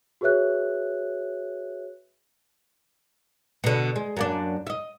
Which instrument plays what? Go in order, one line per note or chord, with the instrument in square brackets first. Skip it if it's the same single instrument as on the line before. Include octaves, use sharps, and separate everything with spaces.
[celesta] F#4 G#4 B4 C#5 E5 F#6
[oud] B2 D3
G#3
F#2 A#3 D4
D#5 E5